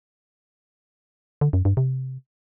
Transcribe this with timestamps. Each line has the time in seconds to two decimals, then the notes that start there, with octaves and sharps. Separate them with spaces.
1.41 D3
1.53 F#2
1.65 G2
1.77 C3